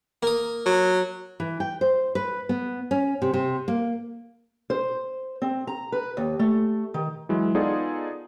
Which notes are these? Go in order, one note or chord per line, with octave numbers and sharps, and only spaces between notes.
A#3 D#6
F#3
E3
G5
C5
B4
B3
C#4
C3
C3
A#3
C5
C4
A#5
B4
D#2
A3
D#3
E3 F#3 G#3 E4
B3 D#4 F4 G#4 A4 D5